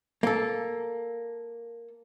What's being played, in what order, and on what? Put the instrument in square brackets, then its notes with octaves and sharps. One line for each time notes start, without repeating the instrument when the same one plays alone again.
[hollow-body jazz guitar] A#3 A4